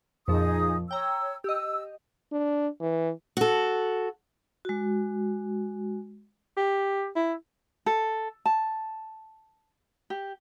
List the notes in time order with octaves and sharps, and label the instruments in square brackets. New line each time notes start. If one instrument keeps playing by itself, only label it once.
[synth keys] F2 A#2 F3 [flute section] D#4 G#4 D#6
[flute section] C#5 E6 [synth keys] G5 A#5
[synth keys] G4 D#5 [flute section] E6
[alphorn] D4
E3
[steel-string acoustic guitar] F#4 A4
[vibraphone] G#3 F#4
[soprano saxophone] G4
E4
[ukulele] A4
A5
G4